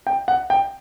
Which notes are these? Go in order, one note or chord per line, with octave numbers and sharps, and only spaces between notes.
G5
F#5
G5